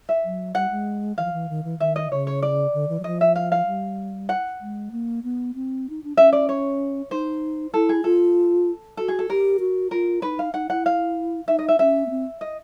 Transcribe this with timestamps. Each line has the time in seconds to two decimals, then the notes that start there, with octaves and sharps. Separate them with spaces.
0.09 E5
0.24 F#3
0.55 G3 F#5
0.70 G#3
1.18 E3 F5
1.25 F3
1.33 E3
1.49 D#3
1.64 E3
1.79 D#3 E5
1.96 D#5
2.11 C#3 C#5
2.27 C#5
2.42 D5
2.74 D3
2.89 E3
3.00 F#3
3.04 F3 D#5
3.21 E5
3.36 F5
3.52 F5
3.67 G3
4.29 F#5
4.61 G#3
4.92 A#3
5.23 B3
5.55 C4
5.90 D#4
6.04 D4
6.17 C#4 E5
6.33 D5
6.49 C#5
7.11 D#4 C5
7.73 E4 A4
7.89 G#4
8.04 F4 A4
8.97 F#4 A4
9.08 G#4
9.19 A4
9.29 G4 A#4
9.60 F#4
9.91 F4 A#4
10.22 D#4 B4
10.39 F5
10.53 D#4 F#5
10.70 E4 F#5
10.86 F5
11.47 D#4 E5
11.59 D#5
11.68 E5
11.79 C#4 E5
12.06 B3
12.10 C4
12.41 D#5